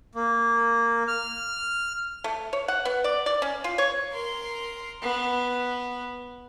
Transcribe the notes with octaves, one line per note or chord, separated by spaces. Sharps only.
A#3
F6
A3
C#5
F#5
B3
D5
D5
C#4
F4
C#5
A#4 C6
B3